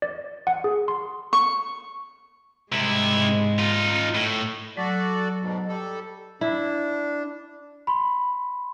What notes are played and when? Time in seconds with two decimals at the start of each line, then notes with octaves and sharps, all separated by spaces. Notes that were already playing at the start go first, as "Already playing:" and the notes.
0.02 D5
0.47 F#5
0.64 G#4
0.88 C6
1.33 C#6
2.72 G#2 C3 G#3 E4
3.58 D#4 F4
4.15 A2
4.77 F#3 F#4 A4 D5
5.41 G#2 B2
5.68 G3 A4
6.41 D4 E4
7.87 B5 C6